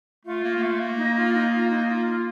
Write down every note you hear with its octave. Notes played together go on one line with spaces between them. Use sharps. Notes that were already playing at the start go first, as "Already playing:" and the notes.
A3 F4
A#3
A#3
A3
A#3
D#4
F4
D#4
F4
D#4
F4
F4